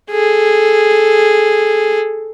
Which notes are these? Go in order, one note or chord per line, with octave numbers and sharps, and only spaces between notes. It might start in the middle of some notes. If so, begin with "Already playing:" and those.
G#4 A4